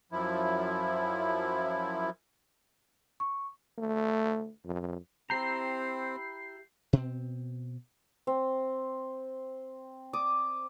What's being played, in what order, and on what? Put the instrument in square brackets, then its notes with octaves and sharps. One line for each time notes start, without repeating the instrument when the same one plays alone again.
[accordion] F#2 F3 E4
[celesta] C#6
[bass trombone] A3
F2
[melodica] C4 [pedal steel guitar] E4 G4 A#5 [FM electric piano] G6 C7
[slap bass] B2 C4
[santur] C4
D5 D6 D#6